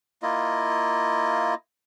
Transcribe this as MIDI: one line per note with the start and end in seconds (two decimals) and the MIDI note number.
0.22 1.54 58
0.22 1.54 64
0.22 1.54 65
0.22 1.54 75